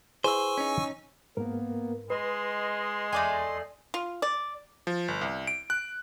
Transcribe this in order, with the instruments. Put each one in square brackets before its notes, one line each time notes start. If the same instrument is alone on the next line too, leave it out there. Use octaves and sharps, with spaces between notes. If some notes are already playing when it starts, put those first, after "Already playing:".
[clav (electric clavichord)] E4 G#4 B4 [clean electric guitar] C5 [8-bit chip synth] G#5 C#6 E6
[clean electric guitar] C#4 D#4
[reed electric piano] G#2 A#4 [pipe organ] A#3 B3
[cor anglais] G#3 [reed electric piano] B4 [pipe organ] D#5 C6
[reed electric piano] E2 [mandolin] A3 D5 G#5
[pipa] F4
D5
[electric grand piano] F3
G1
C2
D7
F#6